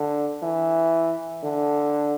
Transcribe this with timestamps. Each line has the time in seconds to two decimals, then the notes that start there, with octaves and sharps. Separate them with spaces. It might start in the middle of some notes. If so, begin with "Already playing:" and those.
Already playing: D3
0.43 E3
1.43 D3